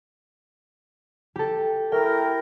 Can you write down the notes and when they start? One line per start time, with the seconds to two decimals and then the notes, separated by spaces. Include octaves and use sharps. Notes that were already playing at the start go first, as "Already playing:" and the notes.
1.36 G4 A4
1.92 A3 E4 A#4 G5